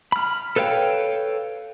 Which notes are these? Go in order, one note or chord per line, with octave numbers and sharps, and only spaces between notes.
B5 F6
A4 B4 C#5 F5 G5